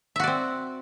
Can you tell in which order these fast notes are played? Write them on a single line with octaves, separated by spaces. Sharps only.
E5 F#4 D5 C4